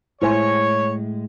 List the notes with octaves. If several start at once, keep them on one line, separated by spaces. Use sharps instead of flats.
A2 G#3 E4 C5 C#5 G#5